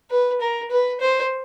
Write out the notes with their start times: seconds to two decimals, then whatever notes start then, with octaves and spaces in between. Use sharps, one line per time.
0.10 B4
0.41 A#4
0.71 B4
1.01 C5